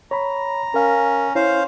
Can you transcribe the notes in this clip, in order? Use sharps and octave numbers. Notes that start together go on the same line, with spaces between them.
C#5 A#5 B5
C#4 A#4 F5
C#4 E4 C5 F5